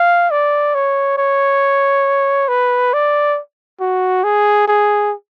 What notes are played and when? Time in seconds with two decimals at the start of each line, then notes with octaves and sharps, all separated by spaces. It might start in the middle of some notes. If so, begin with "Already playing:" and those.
Already playing: F5
0.31 D5
0.75 C#5
1.17 C#5
2.49 B4
2.93 D5
3.80 F#4
4.24 G#4
4.68 G#4